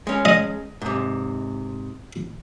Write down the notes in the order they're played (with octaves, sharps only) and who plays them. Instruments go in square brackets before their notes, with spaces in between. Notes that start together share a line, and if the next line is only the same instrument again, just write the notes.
[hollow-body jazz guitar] G#3 C#4
[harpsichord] D#5
[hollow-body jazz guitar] G#2 C3